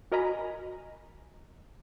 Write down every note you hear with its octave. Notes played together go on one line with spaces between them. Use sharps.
F#4 A#4 D#5 G#5 A#5 B5